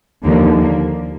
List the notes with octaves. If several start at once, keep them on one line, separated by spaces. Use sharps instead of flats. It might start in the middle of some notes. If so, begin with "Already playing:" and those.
D#2 D3 F3 A#3
A#3